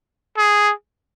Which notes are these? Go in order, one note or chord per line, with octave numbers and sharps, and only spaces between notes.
G#4